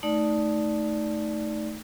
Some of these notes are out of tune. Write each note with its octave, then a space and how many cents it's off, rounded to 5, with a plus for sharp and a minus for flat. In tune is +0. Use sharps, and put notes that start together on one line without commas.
A3 +0 D#4 +0 D5 +0